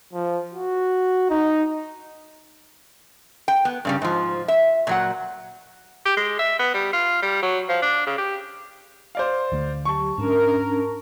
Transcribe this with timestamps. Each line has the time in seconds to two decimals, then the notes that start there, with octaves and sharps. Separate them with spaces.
0.13 F3
0.53 F#4
1.30 D#4
3.48 G5
3.65 B3
3.85 G2 C#3 G3
4.02 G#2 F3
4.48 E5
4.87 A#2 F#3 F#5
6.05 G4
6.17 G#3
6.39 E5
6.59 B3
6.74 G3
6.93 F4
7.22 G3
7.42 F#3
7.68 F3
7.82 D4
8.06 C#3
8.18 G4
9.15 C5 D5 F5
9.52 D2 D3 A3
9.85 F#3 G4 A5 C#6
10.18 G#2 C#4 D4 A#4